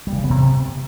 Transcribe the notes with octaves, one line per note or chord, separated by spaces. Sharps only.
G3
C#3
E3
B3
C3